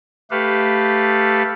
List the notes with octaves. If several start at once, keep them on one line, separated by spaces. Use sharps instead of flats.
A3 G4 A4 B4 F5